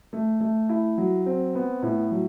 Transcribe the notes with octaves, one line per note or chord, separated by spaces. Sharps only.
A3
A3
E4
F#3
C4
B3
A2
F#3